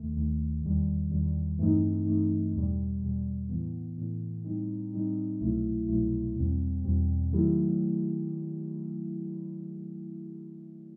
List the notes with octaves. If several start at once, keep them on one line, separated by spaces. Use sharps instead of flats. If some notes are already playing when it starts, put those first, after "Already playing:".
Already playing: D#2 D#3 A3
D#2 D#3 A3
E2 D#3 G3
E2 D#3 G3
G2 E3 A3 C4 D#4
G2 E3 A3 C4 D#4
E2 B2 G3
E2 B2 G3
A2 E3 B3
A2 E3 B3
A2 G3 C4 D#4
A2 G3 C4 D#4
C2 B2 F#3 A3 E4
C2 B2 F#3 A3 E4
E2 B2 G3 C4
E2 B2 G3 C4
D#3 F#3 A3 E4 G4